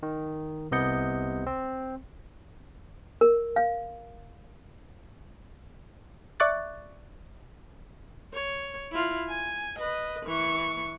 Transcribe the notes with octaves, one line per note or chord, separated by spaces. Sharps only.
D#3
C2 C3 B3 D#5 G6 C#7
C4
A#4
F5
D5 E5 C#6 D6 F#6 A6
C#5
E4 F4
G#5
B4 D#5
E3 C#6